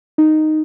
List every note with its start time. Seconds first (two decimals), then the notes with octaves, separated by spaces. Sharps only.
0.18 D#4